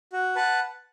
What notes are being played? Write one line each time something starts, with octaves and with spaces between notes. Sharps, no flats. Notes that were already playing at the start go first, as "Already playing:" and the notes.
F#4
B4 F#5 A5